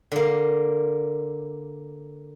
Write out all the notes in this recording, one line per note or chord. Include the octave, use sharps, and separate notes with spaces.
D3 A#3